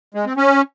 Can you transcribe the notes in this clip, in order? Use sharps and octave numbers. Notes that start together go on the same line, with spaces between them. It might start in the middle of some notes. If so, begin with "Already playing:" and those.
G#3
C4
C#4